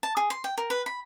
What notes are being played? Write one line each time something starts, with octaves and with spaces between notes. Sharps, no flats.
A5
G#4
C6
G5
A#4
B4
B5